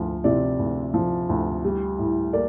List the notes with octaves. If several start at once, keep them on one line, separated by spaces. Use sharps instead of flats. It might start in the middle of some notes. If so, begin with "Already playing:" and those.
Already playing: D2 F3
C3 D5
D2
F3
D2
G3
A2
A#3 D5